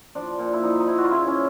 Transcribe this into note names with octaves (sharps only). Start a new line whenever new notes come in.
F3 D4
A#2
E4
F3 D#4
D#4
F3 E4
F#4
F4
C#3 E4
C#4